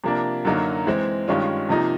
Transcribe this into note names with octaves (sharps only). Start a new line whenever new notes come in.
C3 F3 A#3 D4
F#2 D3 F#3 A#3 D#4
E3 G#3 C4
G2 D#3 G#3 C#4 F4
C3 F3 A#3 D#4